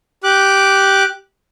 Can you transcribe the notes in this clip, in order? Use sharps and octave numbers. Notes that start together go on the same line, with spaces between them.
G4 D6 F#6